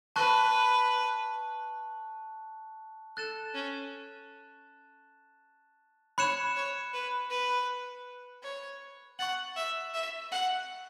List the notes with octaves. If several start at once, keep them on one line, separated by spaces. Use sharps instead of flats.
B4 A5 C#6 F#6
A4 F#6 A6 E7
C#4
C#5 B5 F#6 C#7 E7
C#5
B4
B4
C#5
F#5 C#6 A6 F#7
E5
E5
F#5